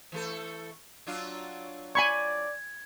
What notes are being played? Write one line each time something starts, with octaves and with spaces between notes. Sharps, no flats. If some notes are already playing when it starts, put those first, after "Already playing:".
E3 A3 A4
F#3 D4 F4
D5 G#5 B5 C#6 G#6